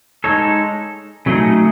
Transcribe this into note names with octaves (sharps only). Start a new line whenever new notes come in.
G#3 D#4 A4 C#5
C#3 F#3 A3 D#4 G#4